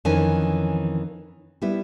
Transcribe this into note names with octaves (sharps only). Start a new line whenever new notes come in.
F2 D#3 E3 C#4 D#4 G#5
G3 B3 E4